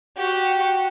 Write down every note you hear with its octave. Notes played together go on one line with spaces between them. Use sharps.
F#4 G4